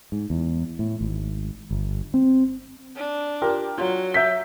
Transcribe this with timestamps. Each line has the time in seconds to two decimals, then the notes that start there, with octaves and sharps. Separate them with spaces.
0.12 G#2
0.30 E2
0.79 A2
1.01 G#1
1.71 G1
2.14 C4
2.96 D4
3.42 F4 G4 A#4
3.78 F#3 F4
4.14 E5 G6 B6